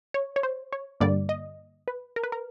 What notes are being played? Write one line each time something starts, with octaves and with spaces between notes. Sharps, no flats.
C#5
C#5
C5
C#5
G2 D3 G3 A#3 D5
D#5
B4
A#4
B4
A#4